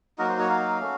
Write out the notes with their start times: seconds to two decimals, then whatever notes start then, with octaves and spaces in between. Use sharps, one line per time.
0.18 F#3 A#3 D#4 F#4 A#4
0.29 C5
0.39 C#5
0.50 F5
0.80 A3 C#4 F#4